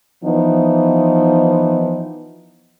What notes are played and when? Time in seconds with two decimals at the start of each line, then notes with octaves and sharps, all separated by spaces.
0.24 E3 F3 B3 D#4